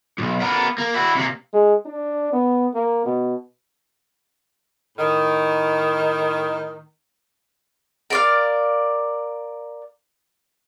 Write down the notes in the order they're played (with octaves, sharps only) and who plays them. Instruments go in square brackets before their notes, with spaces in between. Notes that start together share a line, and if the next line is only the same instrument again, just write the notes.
[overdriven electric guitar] B1 G#2
B3 A#4
A#3
E4 F#4
C3 A#3
[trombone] G#3
D4
B3
A#3
B2
[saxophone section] A2 D#3
[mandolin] A#4 D5 F5